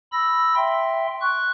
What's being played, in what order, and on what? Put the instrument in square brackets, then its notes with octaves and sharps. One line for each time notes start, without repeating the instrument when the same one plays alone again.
[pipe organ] B5 E6 A#6
E5 G5 C6
C#6 F#6